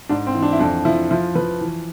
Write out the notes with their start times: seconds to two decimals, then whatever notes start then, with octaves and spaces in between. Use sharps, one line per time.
0.09 G#2 D4
0.27 C4
0.35 E3
0.42 D4
0.53 E4
0.59 F2 D4
0.85 F3 E4
1.10 F3 E4
1.35 F3 B4
1.61 E3